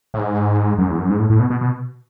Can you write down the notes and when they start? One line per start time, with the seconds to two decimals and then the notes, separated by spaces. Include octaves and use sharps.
0.14 A2
0.19 G#2
0.78 F#2
0.89 E2
0.99 F#2
1.10 G#2
1.19 A2
1.30 A2
1.40 B2
1.50 B2
1.61 B2